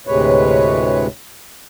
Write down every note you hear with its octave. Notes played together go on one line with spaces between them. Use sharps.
D2 A2 C3 G#3 B4 C#5